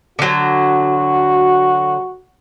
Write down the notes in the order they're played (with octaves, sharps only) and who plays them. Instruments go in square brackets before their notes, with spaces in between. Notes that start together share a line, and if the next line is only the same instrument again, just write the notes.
[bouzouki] D3 F#3 [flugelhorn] F#4